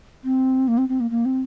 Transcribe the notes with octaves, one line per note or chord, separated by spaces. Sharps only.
C4
A#3
C4
C4
A#3
A#3
C4